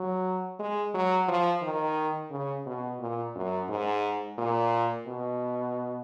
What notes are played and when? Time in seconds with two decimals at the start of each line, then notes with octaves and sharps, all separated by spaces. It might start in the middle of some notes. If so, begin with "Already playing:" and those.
Already playing: F#3
0.59 G#3
0.94 F#3
1.28 F3
1.63 D#3
2.31 C#3
2.66 B2
3.00 A#2
3.35 F#2
3.69 G#2
4.38 A#2
5.07 B2